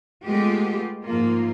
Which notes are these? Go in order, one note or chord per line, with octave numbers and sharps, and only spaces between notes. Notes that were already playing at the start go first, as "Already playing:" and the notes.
G#3 A3 B3 F4 G4
G#2 F3 A#3 F4